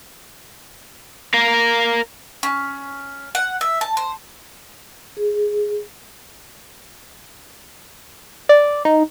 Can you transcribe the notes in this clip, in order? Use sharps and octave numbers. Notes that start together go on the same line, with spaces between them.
A#4 F5
C#4
F#5
E5
A5
C5
G#4
D5
D#4